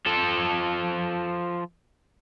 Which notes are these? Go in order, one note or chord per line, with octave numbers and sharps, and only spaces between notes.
F3 A4